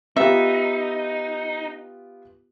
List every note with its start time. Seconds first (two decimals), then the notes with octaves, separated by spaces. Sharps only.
0.17 B3 D#4 F4 G4 E5